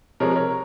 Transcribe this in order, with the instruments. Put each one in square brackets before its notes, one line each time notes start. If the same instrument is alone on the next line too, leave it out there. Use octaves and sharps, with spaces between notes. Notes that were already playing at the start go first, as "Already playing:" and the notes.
[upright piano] C3 F3 G#3 A#4 C#5
A#4 C#5